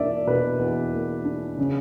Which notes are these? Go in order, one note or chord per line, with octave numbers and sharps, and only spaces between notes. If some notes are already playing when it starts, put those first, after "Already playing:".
Already playing: E2 B2 A#3 D4 D5 E5
B2 B4
E2
A#3
D4
C#3